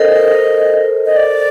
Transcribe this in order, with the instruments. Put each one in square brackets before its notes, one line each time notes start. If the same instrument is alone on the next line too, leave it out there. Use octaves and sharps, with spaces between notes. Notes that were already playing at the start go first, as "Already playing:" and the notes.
Already playing: [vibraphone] A4 A#4 C5 [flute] D#5
[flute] D#5
D5